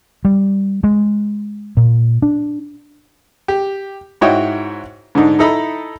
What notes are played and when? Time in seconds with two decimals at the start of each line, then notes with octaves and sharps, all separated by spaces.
0.25 G3
0.84 G#3
1.77 A#2
2.22 D4
3.48 G4
4.21 G#2 E4 F#4 C#5 D#5 G5
5.15 G#2 D3 D4 D#4
5.39 D#4 E4 A4 D#5 A#5 B5